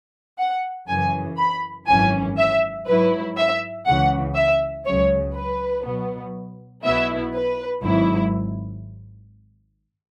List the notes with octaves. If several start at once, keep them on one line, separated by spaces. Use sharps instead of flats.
F#5
F#2 C#3 E3 G#5
B5
G#1 F#2 E3 C#4 G#5
E5
G#2 F#3 E4 B4
E5
C#2 C#3 E3 F#5
E5
C#2 C#3 F#3 C#5
B4
B2 F#3 B3
B1 B2 B3 E4 E5
B4
G#1 G#2 F#3 E4